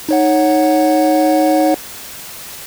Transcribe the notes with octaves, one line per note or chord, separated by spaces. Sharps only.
D#4 C#5 F#5